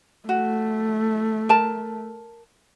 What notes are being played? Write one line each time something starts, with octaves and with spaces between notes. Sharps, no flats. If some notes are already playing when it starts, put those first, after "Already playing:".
A3 F#4
A#4 A5